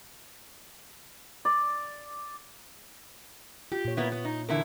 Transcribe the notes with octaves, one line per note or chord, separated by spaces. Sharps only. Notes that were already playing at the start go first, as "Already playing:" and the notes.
D5
F4 G4
A#2 C#5
A#3 B3 E4
B3
D#4
E2 D3 E4 A#4